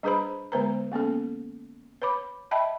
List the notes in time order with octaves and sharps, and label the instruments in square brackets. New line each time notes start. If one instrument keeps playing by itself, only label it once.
[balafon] G3 D4 G#4 B4 C5 B5
D3 G#3 B3 B4 C5 A#5
A#3 B3 C#4 A4
B4 C#5 B5 D6
D#5 E5 G5 A5 B5